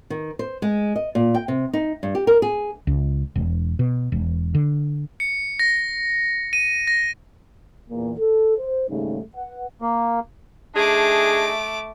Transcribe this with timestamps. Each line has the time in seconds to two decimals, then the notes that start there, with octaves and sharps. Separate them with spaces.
0.10 D#3
0.39 C5
0.62 G#3
0.96 D#5
1.15 A#2
1.34 G5
1.48 C3
1.73 D#4
2.03 G2
2.15 G4
2.27 A#4
2.42 G#4
2.87 C#2
3.36 E1
3.79 B2
4.12 E1
4.55 D3
5.20 C#7
5.59 A#6
6.53 D#7
6.87 A#6
7.90 E2 A#2
8.19 A4
8.57 C5
8.89 D#2 G#2 C#3 G3 A3 D#4
9.36 B4 F#5
9.82 A#3
10.75 A3 D4 D#4 G#4 D6